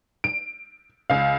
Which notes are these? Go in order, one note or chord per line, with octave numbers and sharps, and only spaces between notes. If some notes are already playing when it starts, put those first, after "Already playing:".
D7
C#2 F5